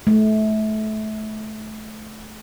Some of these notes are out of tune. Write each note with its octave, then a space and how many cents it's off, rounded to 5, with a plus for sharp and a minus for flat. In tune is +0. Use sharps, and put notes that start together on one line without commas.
A3 -25